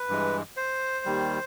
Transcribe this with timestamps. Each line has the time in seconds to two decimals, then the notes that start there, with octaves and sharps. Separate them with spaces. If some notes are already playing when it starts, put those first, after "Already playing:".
Already playing: B4
0.09 G2 E3 G#3
0.57 C5
1.05 D#2 D#3 G3